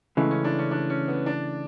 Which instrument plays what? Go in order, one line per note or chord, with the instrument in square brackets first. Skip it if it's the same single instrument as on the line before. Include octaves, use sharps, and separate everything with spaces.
[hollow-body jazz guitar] C#3 E3 A3 [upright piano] G#3
[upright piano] C#4
D4
C#4
D4
C#4
B3
D4